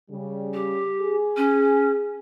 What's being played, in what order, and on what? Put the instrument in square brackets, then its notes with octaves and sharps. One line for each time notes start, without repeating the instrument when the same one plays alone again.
[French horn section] C#3 G3
[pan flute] G4
[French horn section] G#4
[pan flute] C#4